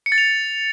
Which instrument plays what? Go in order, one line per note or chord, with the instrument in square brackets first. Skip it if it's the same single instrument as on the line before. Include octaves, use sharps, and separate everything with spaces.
[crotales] C#7
A6
F7